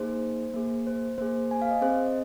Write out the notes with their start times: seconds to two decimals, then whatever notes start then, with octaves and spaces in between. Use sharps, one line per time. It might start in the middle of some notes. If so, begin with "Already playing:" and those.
Already playing: A#3 D#4 G#4 C5
0.54 A#3 G#4
0.87 C5
1.18 A#3 G#4 C5
1.51 G#5
1.62 F5
1.71 D#5
1.81 C4 G#4 C5
2.06 D#5